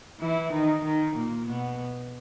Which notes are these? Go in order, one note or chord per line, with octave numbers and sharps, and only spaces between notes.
E3 E4
D#3 D#4
D#3 D#4
A#2 A#3
B2 B3